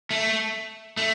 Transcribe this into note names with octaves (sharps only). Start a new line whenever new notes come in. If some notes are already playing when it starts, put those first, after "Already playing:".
A3
A3